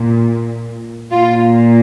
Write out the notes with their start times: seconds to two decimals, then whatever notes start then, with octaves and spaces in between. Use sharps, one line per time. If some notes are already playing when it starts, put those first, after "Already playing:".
Already playing: A#2
1.11 A#2 F4